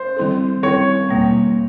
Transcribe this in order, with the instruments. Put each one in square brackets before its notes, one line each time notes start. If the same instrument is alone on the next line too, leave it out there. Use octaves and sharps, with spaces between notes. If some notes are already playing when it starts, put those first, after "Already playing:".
Already playing: [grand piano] C5
[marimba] D#3 G3 C4 E4 A4
[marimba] D#3 G3 C4 E4 A4 [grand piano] C#5
[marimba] E2 B2 G3 A#3